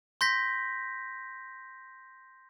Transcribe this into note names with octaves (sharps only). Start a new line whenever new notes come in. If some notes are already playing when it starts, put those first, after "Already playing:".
C6 G6 A#6 B6